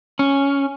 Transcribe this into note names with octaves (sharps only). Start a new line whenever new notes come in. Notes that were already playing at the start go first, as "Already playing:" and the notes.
C#4